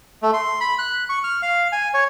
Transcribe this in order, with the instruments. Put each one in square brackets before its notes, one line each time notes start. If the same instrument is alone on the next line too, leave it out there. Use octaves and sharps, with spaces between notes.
[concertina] A3
C6
B5
F#6
C#6
F6
F5
G#5
C#5